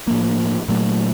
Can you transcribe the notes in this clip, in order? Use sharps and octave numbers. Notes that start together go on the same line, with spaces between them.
A2 F3 A#3
A#2 F#3 A3